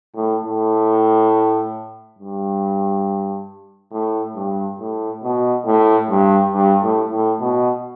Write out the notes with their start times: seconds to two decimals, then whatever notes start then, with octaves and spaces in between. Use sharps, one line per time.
0.16 A2
0.45 A2
2.19 G2
3.93 A2
4.36 G2
4.80 A2
5.23 B2
5.66 A2
6.10 G2
6.53 G2
6.82 A2
7.11 A2
7.40 B2